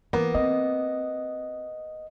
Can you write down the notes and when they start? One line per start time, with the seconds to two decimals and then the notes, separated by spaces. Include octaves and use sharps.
0.13 E3 A#3 B3
0.35 C4 D#5